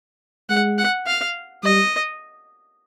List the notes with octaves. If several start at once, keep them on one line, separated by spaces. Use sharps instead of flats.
G#3 F#5
F#5
F5
G3 D#5